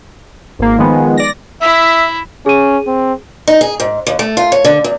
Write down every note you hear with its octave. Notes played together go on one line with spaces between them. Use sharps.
G#1 A#3
D#3 F3 G#3 B3
D5 A#6
E4 E5
C#4 G#4 D#7
C4
D#4
G#4
G#2
D#2
A3
F4
C#5
D3
E2